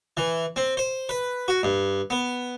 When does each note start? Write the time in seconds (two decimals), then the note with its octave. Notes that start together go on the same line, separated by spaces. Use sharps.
0.17 E3
0.56 C4
0.77 C5
1.09 B4
1.48 F#4
1.63 G2
2.10 B3